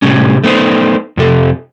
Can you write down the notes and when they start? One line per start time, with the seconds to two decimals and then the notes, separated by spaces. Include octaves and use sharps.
0.02 A2 C3 G3 C#4
0.44 A3 B3 D#4 C5
1.17 F2 C3 A4